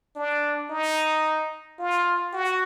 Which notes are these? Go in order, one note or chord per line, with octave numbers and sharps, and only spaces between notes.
D4
D#4
F4
F#4